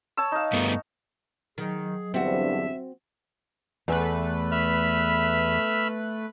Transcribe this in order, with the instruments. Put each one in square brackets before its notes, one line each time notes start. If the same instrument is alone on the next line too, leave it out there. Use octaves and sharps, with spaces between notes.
[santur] C#5 A5 E6
D#4 F5
[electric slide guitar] G2 A3 B3
[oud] D#3 [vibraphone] F#3 D#5 [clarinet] G#4
[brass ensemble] E2 G2 D3 [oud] C4 F#4 [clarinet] E5
[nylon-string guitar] E2 [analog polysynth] A3 B4
[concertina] E5 B5 F6